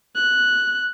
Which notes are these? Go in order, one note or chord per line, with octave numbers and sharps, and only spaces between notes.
F#6